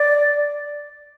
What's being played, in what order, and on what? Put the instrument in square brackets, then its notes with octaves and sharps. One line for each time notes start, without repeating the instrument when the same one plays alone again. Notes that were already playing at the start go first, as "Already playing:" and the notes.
Already playing: [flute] D5